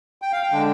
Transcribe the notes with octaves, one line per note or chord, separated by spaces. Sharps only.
G5
F5
G5
D3 G#3 D4